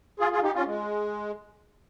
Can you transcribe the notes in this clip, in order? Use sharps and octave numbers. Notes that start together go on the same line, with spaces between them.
F4 G#4
F4 G#4
D#4 G4
C#4 F4
G#3